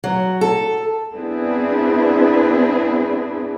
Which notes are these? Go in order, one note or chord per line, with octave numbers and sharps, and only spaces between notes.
F#3
A4
B3 C4 D4 E4 G#4 B4